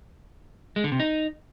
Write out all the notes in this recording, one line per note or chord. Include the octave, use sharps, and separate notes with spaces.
G#3
D3
C3
D#4